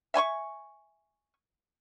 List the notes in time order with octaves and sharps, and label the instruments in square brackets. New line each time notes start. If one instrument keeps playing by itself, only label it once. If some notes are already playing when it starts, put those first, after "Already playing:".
[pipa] E5 G#5 C6 C#6